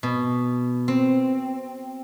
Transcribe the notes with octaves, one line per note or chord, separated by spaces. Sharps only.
B2
C4